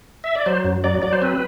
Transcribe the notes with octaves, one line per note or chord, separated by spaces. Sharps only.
E5
D5
F#3 C5
F#2
F#3 D5
F#3 D5
C5
C4 B4